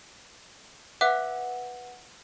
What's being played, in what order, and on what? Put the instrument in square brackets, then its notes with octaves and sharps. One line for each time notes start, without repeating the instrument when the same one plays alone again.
[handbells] B4 F#5 [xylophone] E5 D6 F#6